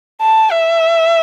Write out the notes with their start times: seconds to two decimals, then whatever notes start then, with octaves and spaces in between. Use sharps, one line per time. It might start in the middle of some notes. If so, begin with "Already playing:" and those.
0.21 A5
0.51 E5